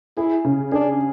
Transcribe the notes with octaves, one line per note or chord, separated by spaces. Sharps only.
E4 G#4
C#3
D4 G#4